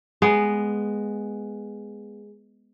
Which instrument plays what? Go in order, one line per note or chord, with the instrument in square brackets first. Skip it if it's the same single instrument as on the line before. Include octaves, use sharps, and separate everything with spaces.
[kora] G#3 B3